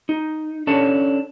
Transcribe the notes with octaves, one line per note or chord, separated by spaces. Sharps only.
D#4
C#4 D4 A4 C#5